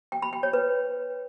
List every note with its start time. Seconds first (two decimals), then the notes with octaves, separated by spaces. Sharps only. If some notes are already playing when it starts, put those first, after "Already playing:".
0.12 G5
0.22 B5
0.33 G5
0.43 C#5
0.53 B4